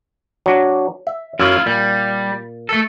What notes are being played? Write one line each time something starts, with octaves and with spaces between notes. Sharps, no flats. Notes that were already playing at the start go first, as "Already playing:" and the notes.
F#3 D4
E5
F#2 E4 F4
A#2 G3
A3 A4